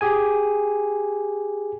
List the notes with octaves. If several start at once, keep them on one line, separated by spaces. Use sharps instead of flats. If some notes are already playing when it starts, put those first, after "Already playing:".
G4 G#4 G#5